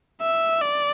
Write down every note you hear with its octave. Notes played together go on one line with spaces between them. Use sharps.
E5
D5